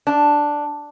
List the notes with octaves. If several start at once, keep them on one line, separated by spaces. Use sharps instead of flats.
D4